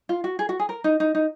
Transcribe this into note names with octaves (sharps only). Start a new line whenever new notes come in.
F4
F#4
G#4
F#4
G#4
A#4
D#4
D#4
D#4